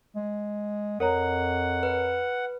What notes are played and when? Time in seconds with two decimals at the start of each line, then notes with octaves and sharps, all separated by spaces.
0.16 G#3
1.00 F2 A#4 C#5 F#5 A#5
1.83 B4